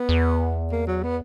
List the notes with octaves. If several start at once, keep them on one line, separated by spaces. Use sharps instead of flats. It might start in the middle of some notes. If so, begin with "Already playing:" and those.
Already playing: B3
E2
A#3
F#3
B3